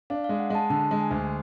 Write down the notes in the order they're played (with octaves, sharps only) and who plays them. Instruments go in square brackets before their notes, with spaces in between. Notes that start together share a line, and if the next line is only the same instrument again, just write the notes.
[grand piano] D4 [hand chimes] F5
[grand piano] G#3 [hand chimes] F5
[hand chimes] F#5
[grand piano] G#3 [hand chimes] A5
[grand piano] D3 [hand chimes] A5
[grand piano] G#3
[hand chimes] G#5
[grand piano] D2